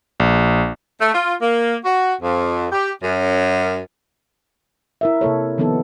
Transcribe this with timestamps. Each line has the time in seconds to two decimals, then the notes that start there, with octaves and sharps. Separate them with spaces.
0.20 A#1
1.00 A3
1.14 F4
1.41 A#3
1.84 F#4
2.21 F2
2.72 G4
3.03 F#2
5.01 E4 A#4 E5
5.21 C3 A#3 A4 C#5
5.58 D#3 F3 B3 D#4 A4